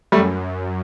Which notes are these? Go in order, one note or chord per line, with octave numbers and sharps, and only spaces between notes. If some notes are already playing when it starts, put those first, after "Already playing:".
F#2 G3 A3